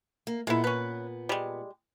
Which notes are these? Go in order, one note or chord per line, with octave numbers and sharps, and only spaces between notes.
A#3
A#2 G#3 B3 E4
C#4 B4
G3 G#3